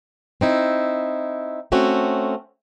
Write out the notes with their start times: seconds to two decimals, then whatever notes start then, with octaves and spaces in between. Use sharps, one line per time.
0.41 C4 D#4 E4
1.72 A3 C4 C#4 F#4